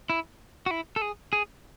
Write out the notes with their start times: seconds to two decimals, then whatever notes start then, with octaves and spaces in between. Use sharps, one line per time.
0.10 E4
0.66 F#4
0.71 E4
0.96 A4
1.02 G#4
1.33 G#4